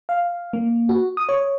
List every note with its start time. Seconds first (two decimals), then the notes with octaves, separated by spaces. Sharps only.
0.09 F5
0.53 A#3
0.89 F#4
1.17 D#6
1.29 C#5